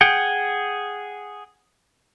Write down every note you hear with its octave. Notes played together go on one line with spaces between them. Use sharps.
G#4 F#5 G5